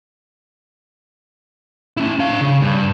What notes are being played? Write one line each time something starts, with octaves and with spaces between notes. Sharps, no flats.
C#4 E4
D4 F5
C#3
G2